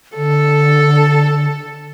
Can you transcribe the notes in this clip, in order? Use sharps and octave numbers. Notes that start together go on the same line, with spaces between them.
D3 A4